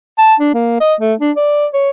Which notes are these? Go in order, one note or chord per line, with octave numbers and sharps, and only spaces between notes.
A5
D4
A#3
D#5
A3
D4
D5
C#5